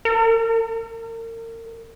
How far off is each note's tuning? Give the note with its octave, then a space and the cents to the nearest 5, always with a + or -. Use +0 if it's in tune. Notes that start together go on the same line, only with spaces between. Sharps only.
A#4 -35